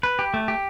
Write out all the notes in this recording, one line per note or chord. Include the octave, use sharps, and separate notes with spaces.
B4
G4
A3
G4